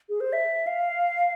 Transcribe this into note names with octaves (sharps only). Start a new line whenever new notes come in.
G#4
C5
E5
F5